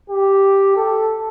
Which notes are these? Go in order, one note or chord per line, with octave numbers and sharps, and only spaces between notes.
G4
A4